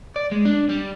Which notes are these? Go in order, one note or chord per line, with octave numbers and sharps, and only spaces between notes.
D5
G#3
D4
G3